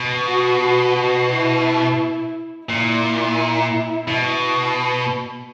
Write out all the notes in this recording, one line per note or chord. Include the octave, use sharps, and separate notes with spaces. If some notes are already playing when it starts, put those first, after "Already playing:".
Already playing: B2
F#4
F#4
F#4
E4
A#2 E4
B2